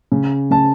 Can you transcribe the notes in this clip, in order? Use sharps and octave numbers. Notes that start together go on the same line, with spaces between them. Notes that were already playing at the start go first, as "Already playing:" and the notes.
C#3
C#3 A5